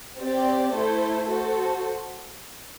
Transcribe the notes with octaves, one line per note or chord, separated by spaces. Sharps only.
C4 G4 D5
A3 E4 A4 C5
F#4 A4 C5